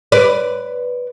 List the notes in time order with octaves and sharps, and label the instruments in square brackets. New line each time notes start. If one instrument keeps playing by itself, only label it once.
[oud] B4 D5